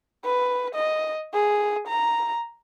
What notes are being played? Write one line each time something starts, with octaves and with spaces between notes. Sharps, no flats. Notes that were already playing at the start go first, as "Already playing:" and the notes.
B4
D#5
G#4
A#5